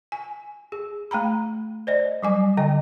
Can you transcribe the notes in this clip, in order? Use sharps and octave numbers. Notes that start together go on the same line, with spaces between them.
G#5
G#4
A3 G5 A#5 B5
C5 D5 D#5
F#3 G3 G#5
D3 D#5 G5